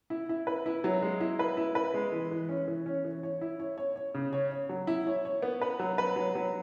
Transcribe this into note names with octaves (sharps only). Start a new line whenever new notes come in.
E4
E4
B4
E4
F#3
G#3
E4
B4
E4
B4
G#3
E3
E3
C#4
E3
C#4
E3
C#5
E4
C#5
C#5
C#5
C#3
C#5
C#5
F#3
E4
C#5
C#5
B3
B4
F#3
B4
F#3
F#3